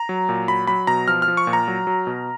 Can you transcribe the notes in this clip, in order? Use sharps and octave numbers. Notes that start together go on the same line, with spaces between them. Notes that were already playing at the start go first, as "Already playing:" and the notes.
Already playing: A#5
F#3
A#2
F#3 B5
F#3 B5
B2 A#5
F3 F6
F6
F3
C#6
A#2
A#5
F#3
F#3
B2